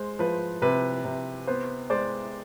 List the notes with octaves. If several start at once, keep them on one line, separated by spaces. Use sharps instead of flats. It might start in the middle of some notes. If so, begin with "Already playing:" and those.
Already playing: G#3 C5
F3 B4
C3 B4
C3
B3 C5
G#3 C5 D5